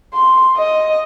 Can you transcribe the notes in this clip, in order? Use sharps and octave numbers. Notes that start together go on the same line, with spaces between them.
C6
D#5